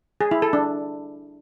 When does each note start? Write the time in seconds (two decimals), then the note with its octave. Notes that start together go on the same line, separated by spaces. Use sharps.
0.21 G#4
0.31 E4
0.42 A4
0.53 D4